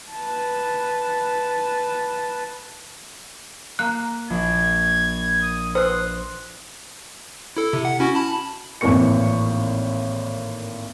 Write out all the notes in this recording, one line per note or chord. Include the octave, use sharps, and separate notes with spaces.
B4 A5
A#3 A#5 F#6
A#1 G#6
D#6
B4 C5 C6 D#6 F#6
E4 A4
C3
F#5
C#4 E4 F#4
A5 B5
G#1 A2 E3 A#3 C#6 C#7